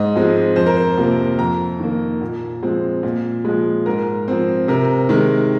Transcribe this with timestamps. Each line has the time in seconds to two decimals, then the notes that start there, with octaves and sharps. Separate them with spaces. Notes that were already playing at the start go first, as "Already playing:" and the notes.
Already playing: G#2 D#5
0.16 F3 G#3 C4
0.56 F2 C5
0.66 A#4
0.77 C5
0.98 C3 F3 A#3
1.39 F2 A#5
1.80 D#3 A#3
2.21 A#2
2.63 F3 G#3 C4
3.03 A#2
3.45 F3 G#3
3.86 G#2 A#4
4.28 F3 C4
4.68 C3 A#4
5.09 D#3 G#3